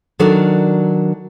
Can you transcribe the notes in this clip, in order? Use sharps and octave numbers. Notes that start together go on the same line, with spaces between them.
D#3 F#3 D4 A4 A#4 D5